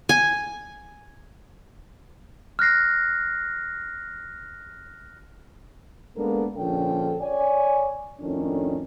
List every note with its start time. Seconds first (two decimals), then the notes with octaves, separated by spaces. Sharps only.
0.09 G#5
2.59 F6 F#6 A#6 C7
6.17 G#3 A#3 B3 D4 A4 A#4
6.57 A#1 D3 F3 C#4 A4 G5
7.21 C#5 D5 G#5
8.20 F2 A2 D#3 C#4 D4